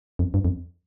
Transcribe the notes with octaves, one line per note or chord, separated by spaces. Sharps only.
F2
G2
F2